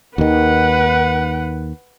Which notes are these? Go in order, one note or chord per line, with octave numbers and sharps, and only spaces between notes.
D#2 D#3 B4 F#5